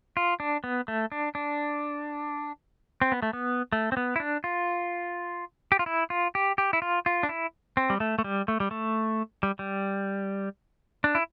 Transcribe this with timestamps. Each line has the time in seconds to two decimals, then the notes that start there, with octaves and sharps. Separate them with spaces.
0.17 F4
0.40 D4
0.64 B3
0.88 A3
1.12 D4
1.35 D4
3.02 C4
3.12 B3
3.23 A3
3.33 B3
3.73 A3
3.92 C4
3.97 B3
4.16 E4
4.20 D4
4.44 F4
5.72 G4
5.79 F4
5.86 E4
6.10 F4
6.35 G4
6.58 G4
6.73 E4
6.82 F4
7.06 F4
7.23 D4
7.29 E4
7.77 C4
7.90 G3
8.00 A3
8.19 A3
8.24 G3
8.48 A3
8.60 G3
8.71 A3
9.43 G3
9.59 G3
11.04 D4
11.15 E4